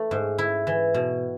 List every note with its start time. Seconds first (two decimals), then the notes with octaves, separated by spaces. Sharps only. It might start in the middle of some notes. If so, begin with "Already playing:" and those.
Already playing: E3 A3
0.11 G#2
0.38 E4
0.67 E3
0.94 B2